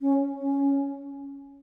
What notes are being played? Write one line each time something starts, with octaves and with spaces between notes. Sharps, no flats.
C#4
C#4